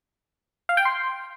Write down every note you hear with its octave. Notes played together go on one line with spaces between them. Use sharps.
F5
G5
C6